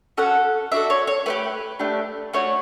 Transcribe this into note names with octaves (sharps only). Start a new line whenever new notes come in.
C#4 F#4 A4 F#5
D4 F#4 A4 E5
C#5
C#5
A3 E4 G4 B4
A3 D4 G4
A3 D4 F#4 C#5